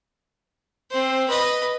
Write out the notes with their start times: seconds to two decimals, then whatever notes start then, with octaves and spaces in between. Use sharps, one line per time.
0.90 C4 C5
1.28 B4 D#5